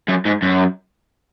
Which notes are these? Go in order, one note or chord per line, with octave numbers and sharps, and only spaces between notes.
F#2
G#2
F#2